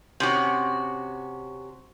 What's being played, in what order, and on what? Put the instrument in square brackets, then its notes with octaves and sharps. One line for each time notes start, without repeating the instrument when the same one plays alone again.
[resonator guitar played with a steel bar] C3 C#4 F#4